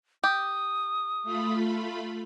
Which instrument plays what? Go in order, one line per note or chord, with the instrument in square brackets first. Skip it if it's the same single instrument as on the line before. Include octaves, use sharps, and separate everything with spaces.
[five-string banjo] G4 [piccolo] D#6
[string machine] A3 F4 B5